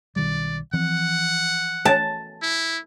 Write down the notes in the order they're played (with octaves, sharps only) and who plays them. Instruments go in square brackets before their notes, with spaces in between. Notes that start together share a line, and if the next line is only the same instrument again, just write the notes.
[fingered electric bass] B1 D#3 G3 [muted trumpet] D5
[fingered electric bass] E3 F3 C4 [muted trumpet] F#5
[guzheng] A5
[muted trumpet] E4